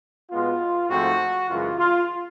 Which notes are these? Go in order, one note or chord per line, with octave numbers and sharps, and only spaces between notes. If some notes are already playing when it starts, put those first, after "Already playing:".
B2 G#3 B3 F4
G#2 F3 A3 C4 F#4
F#2 C#3 E3 G#3 F4
F4